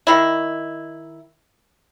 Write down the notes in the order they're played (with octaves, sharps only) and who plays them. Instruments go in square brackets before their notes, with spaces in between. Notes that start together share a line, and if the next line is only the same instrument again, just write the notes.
[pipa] D#3 E4